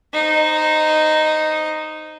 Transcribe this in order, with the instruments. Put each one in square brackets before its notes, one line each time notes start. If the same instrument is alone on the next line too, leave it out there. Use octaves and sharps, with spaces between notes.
[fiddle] D#4 C5